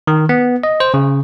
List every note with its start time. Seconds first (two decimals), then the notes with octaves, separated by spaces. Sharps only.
0.07 D#3
0.29 B3
0.64 D#5
0.80 C5
0.94 C#3